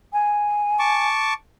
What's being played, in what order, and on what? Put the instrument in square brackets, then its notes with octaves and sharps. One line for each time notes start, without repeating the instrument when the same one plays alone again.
[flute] G#5
[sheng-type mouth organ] A5 C#6 D6